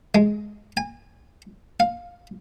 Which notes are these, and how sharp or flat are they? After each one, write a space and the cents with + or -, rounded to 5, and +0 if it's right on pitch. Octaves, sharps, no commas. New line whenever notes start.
G#3 +10
G#5 -30
F5 +10